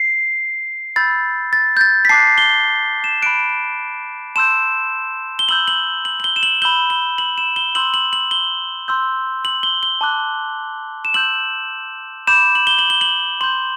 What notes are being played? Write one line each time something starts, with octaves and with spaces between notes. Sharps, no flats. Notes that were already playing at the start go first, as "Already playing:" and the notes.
Already playing: C7
B5 E6 G6 A6
A6
G6
A6
B6
A5 D6 F#6 C7
G7
E7
B5 F#6 D7
A5 C6 E6 G6 E7
G7
B5 E6 G6 F#7
F#7
F#7
F#7
G7
E7
F#7
B5 E6 G6 G7
G7
F#7
E7
G7
C6 E6 G6 F#7
F#7
F#7
G7
C6 E6 G6
F#7
G7
G7
A5 D6 F#6
E7
C6 E6 G6 F#7
B5 D6 G6 E7
F#7
G7
F#7
G7
F#7
C6 G6 F#7